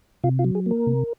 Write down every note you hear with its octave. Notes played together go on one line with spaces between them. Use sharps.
C3 F4
F4
F#3
G#4
A#3 A#4
C3